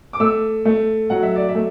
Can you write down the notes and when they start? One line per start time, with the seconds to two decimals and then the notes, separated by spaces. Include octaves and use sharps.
0.13 D6
0.20 A3 E6
0.65 A3
1.10 F#3 F#5
1.23 E5
1.36 D5
1.49 E5
1.55 A3